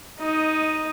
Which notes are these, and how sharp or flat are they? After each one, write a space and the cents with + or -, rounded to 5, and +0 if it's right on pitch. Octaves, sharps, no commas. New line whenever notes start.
D#4 +10 D#5 +0